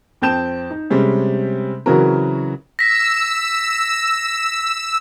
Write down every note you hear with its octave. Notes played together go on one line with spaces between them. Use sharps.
F2 C4 G5 A5 G6 E7
D#4
C3 G3 G#3 C#4
C#3 E3 F#3 C4 F#4 A#4
E6 A#6 B6